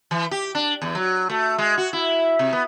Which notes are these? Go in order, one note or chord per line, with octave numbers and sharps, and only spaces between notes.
E3
G4
D4
E2
F#3
A3
G#3
F#4
E4
C3
B3